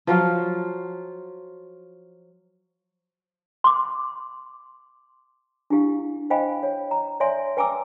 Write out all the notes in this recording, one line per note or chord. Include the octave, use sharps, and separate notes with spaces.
F3 F#3 F4
C6 D6
D4 E4 G4 F5
C5 D#5 F5 G5 G#5 B5
C#5
A#5
C#5 D5 E5 G#5 C6
B4 G5 G#5 A#5 D6 E6